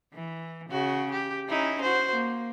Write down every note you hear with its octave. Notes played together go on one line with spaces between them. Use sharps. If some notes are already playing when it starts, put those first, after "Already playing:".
E3
C#3 F#4
G4
C#4 D#4 E4
F#4 C5
A#3